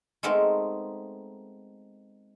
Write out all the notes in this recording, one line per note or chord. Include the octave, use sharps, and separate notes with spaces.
G#3 A3 B3 C4 D#4 A#4